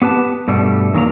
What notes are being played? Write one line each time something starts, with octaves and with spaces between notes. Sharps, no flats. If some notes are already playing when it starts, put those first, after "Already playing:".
B3 G4 B4 A5
G2 B2 G3 A3
E2 D#3 F#3 A#3 A#5